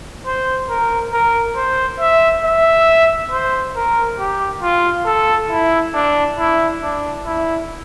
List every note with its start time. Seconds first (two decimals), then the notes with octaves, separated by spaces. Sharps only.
0.26 C5
0.69 A#4
1.13 A#4
1.56 C5
2.00 E5
2.45 E5
3.31 C5
3.76 A#4
4.19 G4
4.62 F4
5.06 A4
5.50 E4
5.94 D4
6.37 E4
6.82 D4
7.26 E4